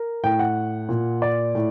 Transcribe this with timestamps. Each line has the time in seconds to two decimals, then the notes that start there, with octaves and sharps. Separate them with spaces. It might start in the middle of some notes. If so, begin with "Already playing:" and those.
Already playing: A#4
0.23 A2 G5
0.39 F#5
0.89 A#2
1.22 D5
1.55 A2